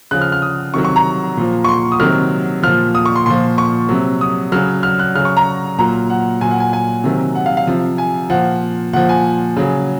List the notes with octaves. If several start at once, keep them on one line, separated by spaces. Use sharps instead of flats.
C#3 F3 F#6
F6
F6
D#6
C3 D#3 F#3 C#6
C#6
A#5
A#2 F3
C#6
C6
D#6
C3 D#3 F#3 F6
A#2 F3 F6
D#6
C#6
C6
A#2 F3 C6
C#6
C3 F#3
D#6
C#3 F#3 F6
F6
F#6
C#3 F#3 F6
C#6
A#5
A#2 F#3 A#5
F#5
A#2 F#3 G#5
F#5
G#5
G#5
C3 D#3 F#3
F#5
F5
F5
C3 F3
G#5
A#2 F3 F#5
A#2 F3 F#5
G#5
C#3 F#3